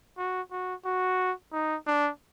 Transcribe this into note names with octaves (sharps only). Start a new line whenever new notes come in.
F#4
F#4
F#4
D#4
D4